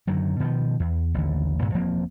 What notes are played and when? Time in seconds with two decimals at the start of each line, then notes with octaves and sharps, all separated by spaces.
0.07 F#2 D3 D#3 F#3
0.40 B2 D#3 F3
0.80 E2
1.14 A1 D#2 D3
1.62 G2 A#2 C#3
1.74 E1 F3 A#3 C4